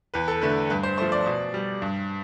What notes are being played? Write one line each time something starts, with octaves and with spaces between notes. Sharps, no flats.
E2 B4
A4
D3 A3 B4
G2 B4
C5
F3 A3 C5
D5
B2
G3
G2